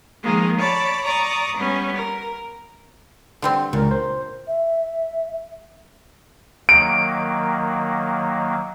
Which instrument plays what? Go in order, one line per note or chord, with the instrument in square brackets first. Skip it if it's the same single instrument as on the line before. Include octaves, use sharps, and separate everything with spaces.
[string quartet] D#3 F3 G#3 A#3
C#5 D5 A5 B5 D6
D5 A#5 C#6 D#6
G3 B3 C#4
A#4
[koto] D3 G3 C4
[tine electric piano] C#2 A#4 [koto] A#2
[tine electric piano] C5
[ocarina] E5
[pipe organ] D#3 F#3 A#3 [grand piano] D7